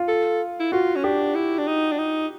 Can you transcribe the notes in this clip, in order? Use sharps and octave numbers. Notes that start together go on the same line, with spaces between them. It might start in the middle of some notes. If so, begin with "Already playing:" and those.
Already playing: F4
A4
E4
F4 F#4
C#4
D4 G4
E4
D4
D#4
D4
D#4